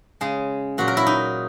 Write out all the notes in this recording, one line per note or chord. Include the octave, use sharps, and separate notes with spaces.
C#3 G#3 G#4
A#2 F#3 F#4
A#4
E4
D#4